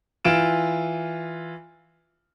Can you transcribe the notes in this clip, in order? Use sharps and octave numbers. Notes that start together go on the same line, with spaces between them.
E3 F4 D7 E7